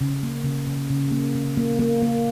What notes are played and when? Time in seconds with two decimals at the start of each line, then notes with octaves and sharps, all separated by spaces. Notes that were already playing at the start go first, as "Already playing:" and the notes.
0.01 C#3
0.23 A#3
0.44 C#3
0.67 C#3
0.90 C#3
1.11 A#3
1.35 C#3
1.57 A#3
1.79 A#3
2.02 A#3